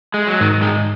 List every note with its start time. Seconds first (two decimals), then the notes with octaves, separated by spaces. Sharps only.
0.14 G#3
0.27 F#3
0.40 G#2 D#3
0.62 D#3 G#3